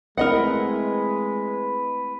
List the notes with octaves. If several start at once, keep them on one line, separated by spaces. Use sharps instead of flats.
G#3 A3 C4 E4 A#4 B4 D#5 F#5